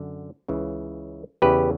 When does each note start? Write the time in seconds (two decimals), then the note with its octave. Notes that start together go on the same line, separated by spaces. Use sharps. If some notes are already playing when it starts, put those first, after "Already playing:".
Already playing: F#2 D3
0.48 C#2 C#3 E3
1.42 E2 C#3 E3 G4 B4